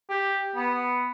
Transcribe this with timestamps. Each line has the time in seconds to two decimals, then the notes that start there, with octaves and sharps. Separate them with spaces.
0.10 G4
0.56 B3